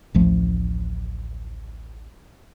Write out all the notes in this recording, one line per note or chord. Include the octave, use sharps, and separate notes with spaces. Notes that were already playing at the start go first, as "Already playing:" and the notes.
A1 D2 F3 A3